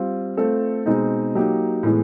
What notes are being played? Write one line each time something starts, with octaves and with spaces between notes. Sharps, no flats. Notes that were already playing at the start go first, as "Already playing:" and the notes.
Already playing: G3 C4 F4
A3 C4 F4 A4
B2 G#3 C4 D#4
F#3 A#3 D#4 G4
A2 E3 G#3 B3